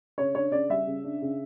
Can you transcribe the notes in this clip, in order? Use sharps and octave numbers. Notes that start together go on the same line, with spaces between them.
C#3 C#5
D4 C#5
C#3 D5
G3 E5
C#3
D4
C#3